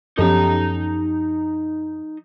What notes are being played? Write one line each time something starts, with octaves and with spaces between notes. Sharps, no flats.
F#2 F3 B3 C#4 D#4 G4 A4 A#5